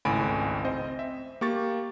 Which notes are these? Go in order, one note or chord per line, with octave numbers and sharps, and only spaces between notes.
G#1 C#2 A2 G#5 B5 D7
C4 C5 D#5
E5
A#3 G4 C#6 A6